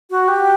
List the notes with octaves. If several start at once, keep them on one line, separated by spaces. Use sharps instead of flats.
F#4
G4